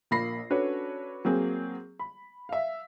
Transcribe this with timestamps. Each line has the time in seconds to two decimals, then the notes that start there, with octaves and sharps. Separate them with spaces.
0.11 A#1 A#3 B5 A#6 C7
0.50 C#4 D4 F#4 A4 B4 C#5
1.25 F#3 A#3 C4 G#4
1.99 B5
2.49 E5 F5